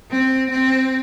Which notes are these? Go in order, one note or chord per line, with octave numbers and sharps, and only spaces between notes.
C4
C4